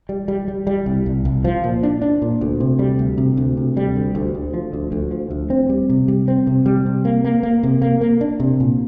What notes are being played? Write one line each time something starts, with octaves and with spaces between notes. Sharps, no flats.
G3
G3
G3
G3
C2
C2
C2
F3
A#2
D4
D4
A#2
D2
C3
G3
D2
C3
D2
C3
G3
D2
D2
D2
F3
D2
D2
F3
D2
C4
G3
C3
G3
C4
C3
G3
C3
A#3
A#3
A#3
C3
A#3
A#3
D4
C3
A#2